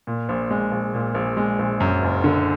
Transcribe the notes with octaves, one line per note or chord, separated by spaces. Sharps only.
A#2
A#1
G#3
A#1
A#2
A#1
G#3
A#1
F#2
F#1
D3